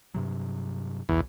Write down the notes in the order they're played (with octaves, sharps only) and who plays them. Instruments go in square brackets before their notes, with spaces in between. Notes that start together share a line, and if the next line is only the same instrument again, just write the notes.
[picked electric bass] G2 C3 F#3
[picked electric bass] B1 [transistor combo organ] E2